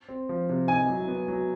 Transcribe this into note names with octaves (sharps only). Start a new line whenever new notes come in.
C4
F3
C3
D#4 G#5
F#3
B3
F#3